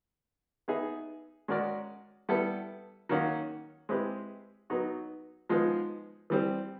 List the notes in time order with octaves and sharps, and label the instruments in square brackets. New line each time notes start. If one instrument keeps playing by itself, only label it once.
[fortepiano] B3 D#4 G#4 B4 E5
G#3 C#4 F#4 A#4 D5
G3 B3 E4 A4
D#3 F#3 A#3 C#4 F#4
G#3 C4 E4 G4 B4
F#3 B3 D#4 F#4
F3 G#3 B3 D#4
E3 G3 C4